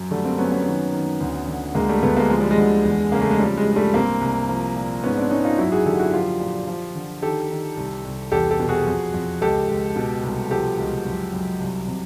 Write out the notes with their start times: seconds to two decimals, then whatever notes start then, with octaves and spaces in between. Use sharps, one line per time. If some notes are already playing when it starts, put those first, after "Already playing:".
Already playing: F#2
0.11 D3 G3 A3
0.25 A#3 C4
0.38 F#2 B3 C#4
0.52 B3 C#4
0.66 D#3
0.93 D#3
1.21 D2
1.48 D3
1.75 D2 G#3 A#3
1.89 G3 A3
2.03 D2 A3 B3
2.16 G#3 A#3
2.30 F3 G#3
2.40 G3
2.51 G#3
2.58 D3
2.85 E2
3.12 C#3 A#3
3.21 A3
3.31 G#3
3.39 F3 G3
3.57 G#3
3.67 G2 G#3
3.76 G3 A3
3.94 C2 A#3 C4
4.21 C2
4.49 F3
4.76 A#2
5.03 G#2 B3 C#4
5.17 C4 D4
5.31 G#2 C#4 D#4
5.45 D#4 F4
5.58 F#2 E4 F#4
5.72 F#4 G#4
5.86 D3 G4 A4
5.99 E4 F#4
6.13 F3 F4 G4
6.40 A#2
6.68 F3
6.95 D3
7.22 D#3 G4 A4
7.50 D#3
7.77 C2
8.05 C2
8.32 E2 G4 A4
8.51 G4 A4
8.59 B2
8.69 F#4 G#4
8.87 F2
9.14 F2
9.41 C#2 G4 A4
9.68 C#2
9.96 B2
10.23 C2
10.50 F3 G4 A4
10.79 C#2
11.05 F#2
11.33 F#2
11.60 C2
11.88 C3